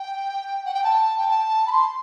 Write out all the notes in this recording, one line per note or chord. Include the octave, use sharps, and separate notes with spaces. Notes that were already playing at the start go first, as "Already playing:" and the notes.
Already playing: G5
F#5
G5
A5
G5
A5
B5
C6